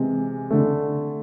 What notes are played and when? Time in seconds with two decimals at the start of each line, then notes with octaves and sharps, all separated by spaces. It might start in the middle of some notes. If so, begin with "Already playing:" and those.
Already playing: C3 E3 G#3
0.51 D3 A3